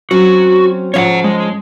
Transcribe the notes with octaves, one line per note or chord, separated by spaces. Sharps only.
F#3 C4 C#4 F#4
G#2 F3 C#4 C#5 F5 F#5
G#3